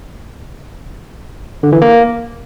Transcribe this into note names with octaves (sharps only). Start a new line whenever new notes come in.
D3
E3
A#3